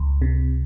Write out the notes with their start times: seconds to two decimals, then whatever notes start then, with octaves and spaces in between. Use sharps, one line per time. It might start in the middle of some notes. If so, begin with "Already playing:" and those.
Already playing: C#2
0.22 C3